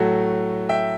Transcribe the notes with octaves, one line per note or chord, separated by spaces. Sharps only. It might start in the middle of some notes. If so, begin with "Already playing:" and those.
Already playing: A2 F#3 A3 F#4 A4
E5 G5